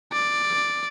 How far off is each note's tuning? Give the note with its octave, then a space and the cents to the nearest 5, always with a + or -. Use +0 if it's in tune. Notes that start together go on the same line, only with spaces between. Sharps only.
D5 +5